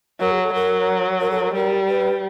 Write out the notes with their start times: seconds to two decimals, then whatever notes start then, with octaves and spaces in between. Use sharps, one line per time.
0.20 F#3 A#4
0.31 G#4
0.42 A4
0.54 F#3 A#4
1.20 A#4
1.30 A4
1.40 A#4
1.53 G3 A#4
1.87 B4